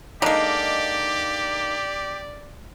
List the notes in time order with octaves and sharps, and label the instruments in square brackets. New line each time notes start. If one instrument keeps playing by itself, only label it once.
[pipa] D3 G#3 [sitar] A#3 D#4 [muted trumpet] G4 [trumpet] D5